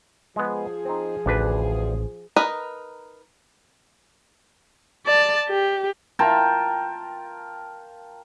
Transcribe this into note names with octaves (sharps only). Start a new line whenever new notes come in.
F3 G#3 B3 G#4
C4 D#4
A1 D2 D4 B4
D#4 A#4 B4 D#5
D5 A5
G4
F4 A#4 G5 A5